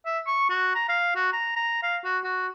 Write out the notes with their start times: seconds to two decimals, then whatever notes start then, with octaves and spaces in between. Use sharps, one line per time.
0.06 E5
0.27 C#6
0.49 F#4
0.75 A#5
0.89 F5
1.16 F#4
1.33 A#5
1.56 A#5
1.83 F5
2.04 F#4
2.24 F#4